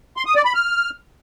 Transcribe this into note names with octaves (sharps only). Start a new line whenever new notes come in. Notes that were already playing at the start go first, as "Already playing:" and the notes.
C6
D#6
D5
B5
F6